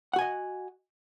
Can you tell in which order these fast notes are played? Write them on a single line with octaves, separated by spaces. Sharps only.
F#5 F#4 G#5 D#5